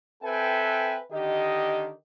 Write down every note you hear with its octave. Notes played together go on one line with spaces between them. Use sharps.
C4 A4 B4 E5 G5 G#5
D3 D#3 G4 D#5